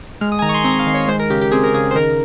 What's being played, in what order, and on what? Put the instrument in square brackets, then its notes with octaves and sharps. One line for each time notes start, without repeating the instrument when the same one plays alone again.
[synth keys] G#3 F6
D#6
G#5
D#3 A#5
C#6
C6
C4 A#5
F5
D#3
C#5
G#3 C5
A#4
C#3 G4
G4
C4 G#4
A#4
C#3 G#4
C5
D#3 A#4